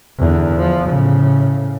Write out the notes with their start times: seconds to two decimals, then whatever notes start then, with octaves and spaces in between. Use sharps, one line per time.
0.19 E2 D3
0.55 F3
0.89 A2 C#3